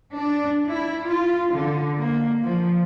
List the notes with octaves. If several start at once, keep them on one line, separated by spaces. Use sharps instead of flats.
D4
E4
F4
D3
A#3
F3